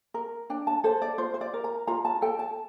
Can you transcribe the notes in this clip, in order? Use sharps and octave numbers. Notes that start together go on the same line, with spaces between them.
A#4
D4 G5
A5
A4 C5
D5
F4 C5
C5
D5
A#4
A#5
F4 A#5
A5
A4 G5
A5